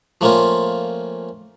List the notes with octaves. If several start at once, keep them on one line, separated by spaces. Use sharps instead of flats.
F3 A3 A#3 C4 C#4 F4